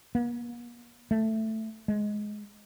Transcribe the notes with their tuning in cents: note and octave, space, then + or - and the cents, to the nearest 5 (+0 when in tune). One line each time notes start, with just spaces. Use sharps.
A#3 +40
A3 +5
G#3 +10